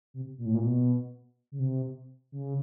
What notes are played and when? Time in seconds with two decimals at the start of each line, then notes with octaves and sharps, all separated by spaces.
0.14 C3
0.38 A#2
0.46 A2
0.54 A#2
0.63 B2
1.52 C#3
1.60 C3
2.32 C#3